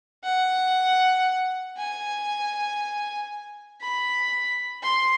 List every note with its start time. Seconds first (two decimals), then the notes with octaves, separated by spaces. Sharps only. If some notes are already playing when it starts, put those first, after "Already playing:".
0.24 F#5
1.77 G#5
3.81 B5
4.83 C6